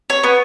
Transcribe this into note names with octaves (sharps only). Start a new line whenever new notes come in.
C#5
B3